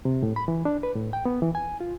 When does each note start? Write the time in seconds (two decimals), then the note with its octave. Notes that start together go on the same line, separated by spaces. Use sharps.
0.05 C3
0.23 A2
0.36 B5
0.48 E3
0.65 D4
0.83 B4
0.95 A2
1.13 G5
1.25 B3
1.42 E3
1.55 G#5
1.81 F4